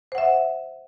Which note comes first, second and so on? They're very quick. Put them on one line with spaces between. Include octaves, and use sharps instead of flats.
C5 F#5 E5